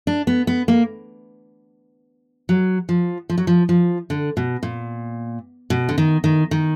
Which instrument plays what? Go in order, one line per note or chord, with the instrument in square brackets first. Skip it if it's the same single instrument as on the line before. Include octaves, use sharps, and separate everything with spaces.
[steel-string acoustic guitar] D4
B3
B3
A#3
F#3
F3
F3
F#3
F3
F3
D3
B2
A#2
B2
D3
D#3
D#3
D#3